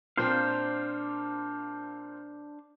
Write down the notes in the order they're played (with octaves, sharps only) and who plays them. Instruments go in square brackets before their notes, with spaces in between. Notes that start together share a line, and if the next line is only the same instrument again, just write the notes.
[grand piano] A#2 C4 [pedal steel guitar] D4 C5 F5